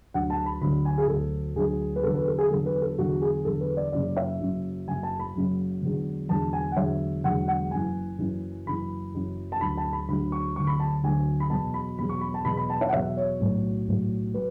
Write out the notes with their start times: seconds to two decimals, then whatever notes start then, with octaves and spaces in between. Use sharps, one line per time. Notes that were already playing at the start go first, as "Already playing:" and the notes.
0.14 D2 D3 F#3 F#5
0.30 A5
0.46 B5
0.61 D2 D3 F#3 B5
0.85 G#5
0.98 G#4
1.08 D2 D3 F#3 A4
1.55 D2 D3 F#3 G#4
1.96 B4
2.03 E2 D3 F#3 A4
2.15 B4
2.28 A4
2.38 G#4
2.50 E2 D3 F#3 A4
2.66 B4
2.82 A4
2.98 E2 D3 F#3 F#4
3.21 G#4
3.45 E2 D3 F#3 A4
3.61 B4
3.77 D5
3.92 F#1 F#2 C#3 F#3 D5
4.16 E5
4.40 F#1 F#2 C#3 F#3
4.88 F#1 F#2 C#3 F#3 G#5
5.03 A5
5.19 B5
5.35 F#1 F#2 C#3 F#3
5.82 E1 E2 D3 F#3
6.29 E1 E2 D3 F#3 A5
6.53 G#5
6.72 F#5
6.76 E1 E2 D3 F#3 E5
7.24 E1 E2 D3 F#3 F#5
7.48 F#5
7.71 F#1 F#2 E3 G#5
8.18 F#1 F#2 E3
8.66 F#1 F#2 E3 B5
9.14 F#1 F#2 E3
9.52 A5
9.61 D2 D3 F#3 B5
9.77 A5
9.93 B5
10.09 D2 D3 F#3 B5
10.32 C#6
10.55 D2 D3 F#3 C#6
10.67 B5
10.80 A5
11.03 D2 D3 F#3 G#5
11.40 B5
11.50 E2 B2 F#3 A5
11.74 B5
11.99 E2 B2 F#3 B5
12.09 C#6
12.21 B5
12.34 A5
12.45 E2 B2 F#3 B5
12.57 B5
12.70 A5
12.81 E5
12.88 F#5
12.93 E2 B2 F#3 E5
13.17 C#5
13.40 B1 A2 F#3
13.88 B1 A2 F#3
14.34 F#3 B4